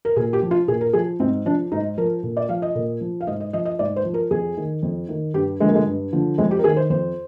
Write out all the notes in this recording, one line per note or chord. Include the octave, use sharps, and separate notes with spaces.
A#4
A#2 G#4
G4
F3
F4
A#2 G#4
A#4
F3 G#4
G#2 C4
F3 D4
G#2 D#4
F3 A#4
A#2
D5
F3 F5
D#5
A#2
F3
F5
G#2 D#5
D#5
F3 D#5
D#5
G#2 D5
C5
F3
A#4
F2 G#4
D#3
F2
D#3
G2 G4
D3 F3 G#3
A#3
G#3
G2
D3 F3
F2 G#3
G4
A#4
D#3 G#4
C5
F2 C5